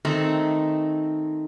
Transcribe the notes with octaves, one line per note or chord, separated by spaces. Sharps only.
D#3 A3 C4 D#4